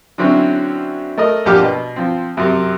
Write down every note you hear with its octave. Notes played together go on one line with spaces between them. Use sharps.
D3 F#3 C4 C#4 E4 F#4
A3 A#4 D#5
A#1 F3 G4 F#5 D6 F6
B2
F3 C4
F#2 C3